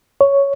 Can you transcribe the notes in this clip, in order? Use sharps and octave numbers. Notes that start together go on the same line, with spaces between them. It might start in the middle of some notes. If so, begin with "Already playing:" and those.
C#5